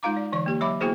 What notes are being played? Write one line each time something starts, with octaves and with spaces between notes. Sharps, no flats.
G#3 D#4 F4 F5 A#5 D6
D5
D3 E3 D5 C#6
A#3 G4
F#3 C#5 E5 B5 D6
A#3 B3 E4 F#4 G#4 C5